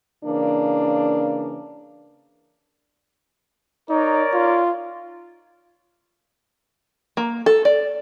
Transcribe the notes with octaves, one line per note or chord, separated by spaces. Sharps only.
C#3 E3 A#3 D4
D#4 A#4 C#5 D5
F4
A#3
A4
D5